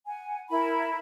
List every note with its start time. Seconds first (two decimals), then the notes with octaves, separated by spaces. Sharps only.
0.07 F#5 G#5
0.50 E4 A#4 B5